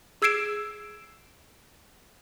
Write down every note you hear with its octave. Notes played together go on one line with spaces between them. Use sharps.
G#4 E6 G#6 C7 D7 E7